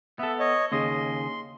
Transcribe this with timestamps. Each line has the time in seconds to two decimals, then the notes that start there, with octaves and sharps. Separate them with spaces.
0.19 B3 A4 E5
0.39 C#5 D#5
0.72 D#2 C#3 D#5 C6